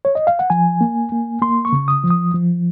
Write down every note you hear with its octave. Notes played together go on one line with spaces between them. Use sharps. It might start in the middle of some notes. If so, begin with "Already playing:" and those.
C#5
D#5
F5
F#5
F3 G#5
A#3
A#3
A#3 C6
C#6
C#3
D#6
F3
D#6
F3